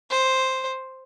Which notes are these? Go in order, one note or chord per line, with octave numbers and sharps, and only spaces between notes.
C5